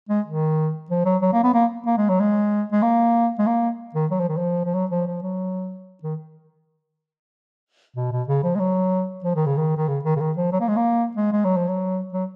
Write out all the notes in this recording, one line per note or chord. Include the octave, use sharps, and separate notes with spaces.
G#3
D#3
F3
F#3
F#3
A#3
B3
A#3
A#3
G#3
F#3
G#3
G#3
A#3
G#3
A#3
D#3
F#3
F3
D#3
F3
F3
F#3
F3
F3
F#3
D#3
B2
B2
C#3
F3
G#3
F#3
F3
D#3
C#3
D#3
D#3
C#3
D#3
C#3
D#3
F3
F#3
A#3
G#3
A#3
G#3
G#3
F#3
F3
F#3
F#3